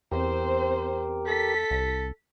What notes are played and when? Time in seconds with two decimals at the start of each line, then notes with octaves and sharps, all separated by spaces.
0.12 E2 C4 G4 A#4 C5
1.27 A4 B6
1.71 C2